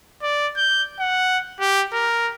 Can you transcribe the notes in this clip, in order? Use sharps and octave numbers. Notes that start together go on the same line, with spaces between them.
D5
G6
F#5
G4
A#4